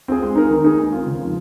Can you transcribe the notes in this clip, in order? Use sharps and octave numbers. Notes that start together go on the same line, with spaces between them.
C4 F4 G#4
G#3
D#4 A#4
D#3
A#3 D#4 G#4
G#3
C4 F4
C#3
F3 G#3